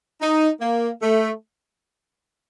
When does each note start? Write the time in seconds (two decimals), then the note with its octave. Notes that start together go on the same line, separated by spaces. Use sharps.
0.21 D#4
0.61 A#3
1.02 A3